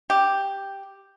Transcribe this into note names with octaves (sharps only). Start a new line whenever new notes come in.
G4